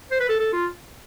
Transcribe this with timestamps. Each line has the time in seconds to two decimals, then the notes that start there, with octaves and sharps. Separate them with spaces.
0.11 C5
0.20 B4
0.29 A4
0.40 A4
0.53 F4